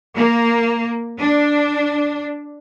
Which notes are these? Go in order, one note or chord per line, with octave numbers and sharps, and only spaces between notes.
A#3
D4